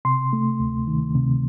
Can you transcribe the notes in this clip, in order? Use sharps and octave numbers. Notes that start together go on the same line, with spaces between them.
C3 C6
A3
D2
D#3
C3